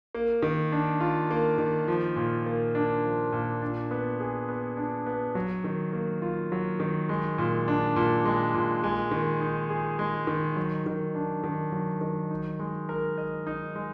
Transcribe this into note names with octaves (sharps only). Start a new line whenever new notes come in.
A#3
D#3
D4
F4
A#3
D#3
F3
A#2
A#3
D4
F3
A#2
D4
B3
G#4
B3
D4
B3
F#3
D#3
A#3
F4
F#3
D#3
G#3
A#2
D4
A#2
G#3
A#2
G#3
D#3
D#4
G#4
G#3
D#3
F#3
D#3
D4
D#3
F#3
D#3
D#4
G#3
A#4
D#5
D#4
G#3